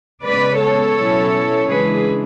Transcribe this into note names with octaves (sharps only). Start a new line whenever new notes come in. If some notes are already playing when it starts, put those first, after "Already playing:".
C#3 G#3 B3 B4 D5
A4 C#5
B2 F#3 C#4 E4
C#3 E3 G#3 D4 G#4 B4